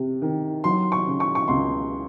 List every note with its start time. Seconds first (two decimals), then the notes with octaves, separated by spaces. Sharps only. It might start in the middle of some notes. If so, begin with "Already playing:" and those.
Already playing: C3
0.22 D#3
0.64 F#3 C6
0.92 C#6
1.07 C#3
1.20 C#6
1.35 C#6
1.48 C#2 C6